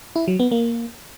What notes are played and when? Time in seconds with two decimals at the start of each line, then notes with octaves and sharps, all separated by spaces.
0.16 E4
0.28 F#3
0.40 B3
0.51 A#3